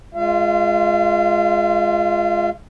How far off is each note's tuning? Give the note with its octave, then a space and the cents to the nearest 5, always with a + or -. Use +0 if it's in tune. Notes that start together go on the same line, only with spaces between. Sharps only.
G#3 +5 F4 +0 F5 -40